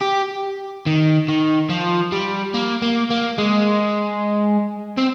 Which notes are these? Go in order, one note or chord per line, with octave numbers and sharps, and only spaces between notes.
G4
D#3
D#3
F3
G3
A#3
A#3
A#3
G#3
C4